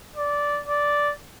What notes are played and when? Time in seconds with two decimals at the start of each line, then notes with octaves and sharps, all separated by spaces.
0.16 D5
0.68 D5